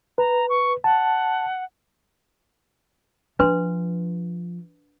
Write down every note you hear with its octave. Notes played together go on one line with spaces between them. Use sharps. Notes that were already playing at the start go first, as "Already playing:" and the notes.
B4 A#5
C#6
F#5 A5
F3 D4 B4 C6